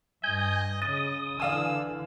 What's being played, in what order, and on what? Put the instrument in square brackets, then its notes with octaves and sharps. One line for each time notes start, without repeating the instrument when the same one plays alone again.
[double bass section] G2 [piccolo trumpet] D#5 [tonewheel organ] G#5 G6
[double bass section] C#3 [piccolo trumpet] D#5 [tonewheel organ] D#6 [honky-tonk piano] A6
[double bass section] D3 E3 [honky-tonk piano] D5 F5 G#5 [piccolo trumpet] E6